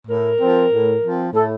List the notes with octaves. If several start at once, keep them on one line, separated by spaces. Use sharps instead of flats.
A2 A#4
F3 C4
A2
F3 C4
A2 A4